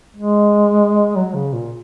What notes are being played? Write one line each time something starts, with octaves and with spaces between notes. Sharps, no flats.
G#3
F#3
C#3
A#2